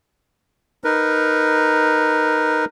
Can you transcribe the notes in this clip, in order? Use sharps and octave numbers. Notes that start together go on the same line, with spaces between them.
D#4 A#4 B4